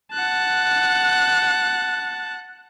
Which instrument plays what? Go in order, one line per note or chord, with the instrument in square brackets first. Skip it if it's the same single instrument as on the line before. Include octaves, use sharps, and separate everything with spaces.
[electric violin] F#5 F#6 [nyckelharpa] A5